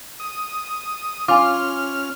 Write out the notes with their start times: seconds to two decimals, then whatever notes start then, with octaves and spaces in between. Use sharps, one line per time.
0.20 D#6
1.28 C#4 F4 G#5 D6 F6